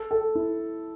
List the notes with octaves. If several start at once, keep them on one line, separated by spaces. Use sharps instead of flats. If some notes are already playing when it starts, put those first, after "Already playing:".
Already playing: A4
A4
E4